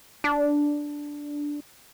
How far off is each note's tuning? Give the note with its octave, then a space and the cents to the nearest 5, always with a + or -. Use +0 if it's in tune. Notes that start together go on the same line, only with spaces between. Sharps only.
D4 -5